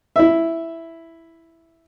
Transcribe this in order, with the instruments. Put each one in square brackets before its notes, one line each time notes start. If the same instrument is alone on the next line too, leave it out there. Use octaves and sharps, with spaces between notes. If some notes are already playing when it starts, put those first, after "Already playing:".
[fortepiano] E4 E5